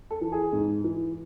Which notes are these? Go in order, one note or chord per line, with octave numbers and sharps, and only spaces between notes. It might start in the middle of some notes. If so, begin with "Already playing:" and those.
A4
E3
G#4
G#2
E3